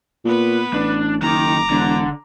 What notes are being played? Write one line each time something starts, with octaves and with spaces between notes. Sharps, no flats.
A#2 B3 B4
A1 D4
F#1 D#3 A#5 D6
E1 D3